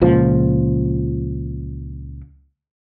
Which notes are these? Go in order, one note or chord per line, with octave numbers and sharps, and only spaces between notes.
C#2 A#2 F3